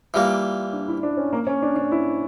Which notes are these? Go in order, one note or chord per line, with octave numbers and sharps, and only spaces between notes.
E3 G3 A#3 F4
D4
E4
D4
C#4
A#3
C#4
D4
D4
E4